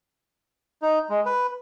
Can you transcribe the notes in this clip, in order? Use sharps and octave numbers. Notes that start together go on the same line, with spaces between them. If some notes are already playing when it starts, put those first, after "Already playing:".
D#4
G#3
B4